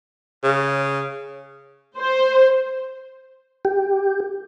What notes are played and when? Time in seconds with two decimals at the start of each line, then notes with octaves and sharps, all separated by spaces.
0.44 C#3
1.97 C5
3.65 G4